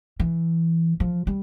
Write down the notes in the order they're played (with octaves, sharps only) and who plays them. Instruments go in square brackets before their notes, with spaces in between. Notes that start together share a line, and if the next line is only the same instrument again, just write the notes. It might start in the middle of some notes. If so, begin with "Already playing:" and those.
[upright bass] E3
F3
G3